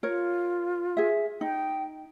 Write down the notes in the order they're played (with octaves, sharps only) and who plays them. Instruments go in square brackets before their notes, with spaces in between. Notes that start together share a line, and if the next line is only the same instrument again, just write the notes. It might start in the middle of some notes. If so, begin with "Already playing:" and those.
[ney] F4 [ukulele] A#4 C#5
[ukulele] G#4 E5
[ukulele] D#4 [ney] G5